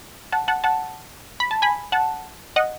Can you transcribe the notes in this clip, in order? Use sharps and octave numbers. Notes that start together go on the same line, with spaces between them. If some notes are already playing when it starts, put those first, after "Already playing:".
F#5 A5
F#5 A5
F#5 A5
B5
A5
G#5 B5
F#5 A5
D#5 F#5